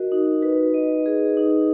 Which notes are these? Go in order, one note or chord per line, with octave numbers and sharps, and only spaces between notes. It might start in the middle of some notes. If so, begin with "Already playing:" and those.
Already playing: F#4 A#4 D#5
D#4
B4
D#5
G#4
D#4